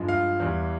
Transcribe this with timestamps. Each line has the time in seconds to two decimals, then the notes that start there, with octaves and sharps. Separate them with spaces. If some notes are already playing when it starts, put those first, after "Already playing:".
Already playing: G2 F3 G#3
0.08 F5
0.40 E2 E3 G3